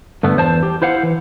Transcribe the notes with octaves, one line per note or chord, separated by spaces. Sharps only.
G2 D3 A3 B3
E2 C5 A5
G4
E4 C5 F5 F#5
E3